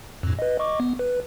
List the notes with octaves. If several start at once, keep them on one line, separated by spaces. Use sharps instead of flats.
F2 A2
B4 D#5
D#5 C#6 D6
B3
B4